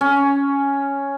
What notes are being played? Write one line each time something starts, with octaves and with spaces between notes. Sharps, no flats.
C#4